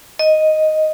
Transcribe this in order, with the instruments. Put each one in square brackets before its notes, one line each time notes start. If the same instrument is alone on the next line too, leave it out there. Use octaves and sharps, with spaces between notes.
[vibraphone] D#5